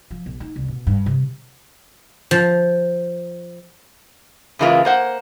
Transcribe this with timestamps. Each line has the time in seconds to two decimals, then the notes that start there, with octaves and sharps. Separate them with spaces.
0.11 F3
0.26 B1
0.40 D#4
0.56 C2
0.68 B2
0.87 G2
1.06 C3
2.31 F3
4.59 F#2 C#3 E3 G#3 A#3 F4
4.85 A#3 C5 F#5